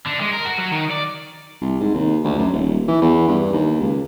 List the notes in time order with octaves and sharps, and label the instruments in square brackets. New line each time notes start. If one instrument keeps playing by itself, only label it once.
[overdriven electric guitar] D3
G#3
A#4
F#4
F#3
D#3
D5
[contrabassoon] C2
G#2
D#2
D2
F#2
D#1
E3
E2
G2
D#2
C#2